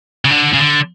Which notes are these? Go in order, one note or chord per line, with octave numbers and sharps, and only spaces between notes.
C#3
D3
C#3
D3